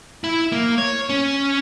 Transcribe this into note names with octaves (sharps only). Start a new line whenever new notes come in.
E4
A#3
C#5
C#4